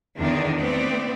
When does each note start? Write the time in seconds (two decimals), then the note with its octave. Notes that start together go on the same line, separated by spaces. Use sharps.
0.19 E2 D3 D#3 D4
0.58 A3 B3 C4 D5